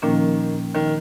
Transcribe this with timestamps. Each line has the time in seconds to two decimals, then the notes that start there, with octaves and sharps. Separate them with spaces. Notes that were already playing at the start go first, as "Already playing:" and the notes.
0.02 A#2 D#3 F3 A#3 C#4
0.74 D#3